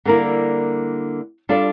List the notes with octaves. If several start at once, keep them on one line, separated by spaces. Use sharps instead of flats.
D3 G3 A#3 E4 A#4
G3 D4 F4 A4 D5